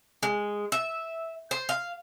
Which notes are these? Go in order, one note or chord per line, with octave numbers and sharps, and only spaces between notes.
G#3
E5
C5
F5